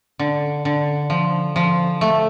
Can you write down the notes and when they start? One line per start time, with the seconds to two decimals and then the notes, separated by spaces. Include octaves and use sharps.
0.19 D3
0.65 D3
1.10 F3
1.56 F3
2.01 A3